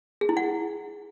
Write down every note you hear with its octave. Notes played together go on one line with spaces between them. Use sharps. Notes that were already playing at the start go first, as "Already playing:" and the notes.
G#4
E4
F#5